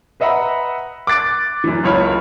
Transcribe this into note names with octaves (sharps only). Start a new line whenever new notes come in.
B4 D#5 E5 F#5 A#5 B5
D6 F#6 A6 D7
F#2 E3
F#1 C#2 C#5 B5 F6